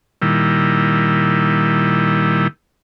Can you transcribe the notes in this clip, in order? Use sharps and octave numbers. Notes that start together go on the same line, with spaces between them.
A#2 D#3 G3 E4